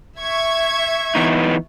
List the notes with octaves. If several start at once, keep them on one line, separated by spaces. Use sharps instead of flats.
E5 C#6 G#6
E3 B3 D#4